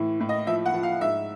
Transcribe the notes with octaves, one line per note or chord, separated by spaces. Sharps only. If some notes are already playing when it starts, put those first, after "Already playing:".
Already playing: A2 E3
A2
D#5
F3 E5
F#5
F3
F5
G#2 E5